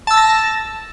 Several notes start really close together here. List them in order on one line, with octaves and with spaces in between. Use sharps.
A5 E6 A6 A#6